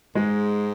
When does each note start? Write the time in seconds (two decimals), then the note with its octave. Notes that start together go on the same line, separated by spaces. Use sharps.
0.15 G#2 G#3